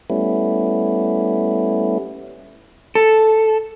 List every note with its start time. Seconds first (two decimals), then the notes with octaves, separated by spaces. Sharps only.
0.10 G3 A3 B3 C#4 E4
2.95 A4